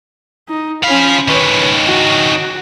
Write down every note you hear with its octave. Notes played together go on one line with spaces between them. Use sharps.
D#4
F3 C#4 F5 B5
D#3 C#4 B4 C#5
F#4